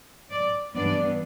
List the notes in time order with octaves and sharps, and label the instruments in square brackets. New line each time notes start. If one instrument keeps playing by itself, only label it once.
[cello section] D5
G2 E3 B3 D4 D5